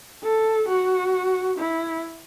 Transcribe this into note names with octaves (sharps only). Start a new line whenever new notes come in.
A4
F#4
E4